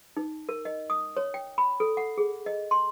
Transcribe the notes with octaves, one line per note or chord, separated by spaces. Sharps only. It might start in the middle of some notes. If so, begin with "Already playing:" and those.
D#4
A#4
D#5
D#6
C#5
G5
B5
A4
F#5
G#4
D#5
C6